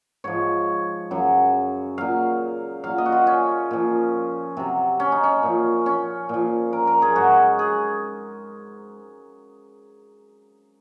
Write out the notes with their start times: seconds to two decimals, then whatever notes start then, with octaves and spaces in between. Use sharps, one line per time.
0.24 G#2 F3 C#5
1.11 F#2 C#3 F#3
1.98 A#2 F#3 F5
2.84 A#2 F#3 F5
2.98 D#5
3.06 F#4
3.12 F4
3.27 C#4
3.71 A#2 F3
4.57 C3 F#3
5.00 C#4
5.12 D#4
5.24 C#4
5.43 A#2 F3
5.86 C#4
6.29 A#2 F3
6.73 A#4
6.87 A#4
7.02 G#4
7.16 G#2 F#3 F#4
7.59 G#4